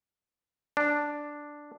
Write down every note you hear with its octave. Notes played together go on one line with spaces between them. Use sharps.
D4